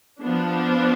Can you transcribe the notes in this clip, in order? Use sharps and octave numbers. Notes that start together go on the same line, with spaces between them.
F3 B3 D4